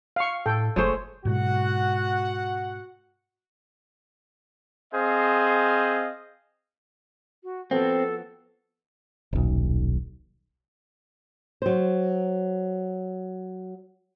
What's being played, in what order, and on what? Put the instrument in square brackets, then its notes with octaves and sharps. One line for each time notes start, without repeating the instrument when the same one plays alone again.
[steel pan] F5 C#6
[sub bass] A2 [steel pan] A4 G5
[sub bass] F#1 [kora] G#3 A3 C5 [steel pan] C#5
[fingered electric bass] G#2 B2 G#3 [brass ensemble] F#4 F#5
[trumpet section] C4 G#4 C5 D#5 F5
[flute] F#4
[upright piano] F3 B3 F#4 [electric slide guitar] C4 [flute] A4
[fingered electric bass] D#1 B1
[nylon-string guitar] F#3 C5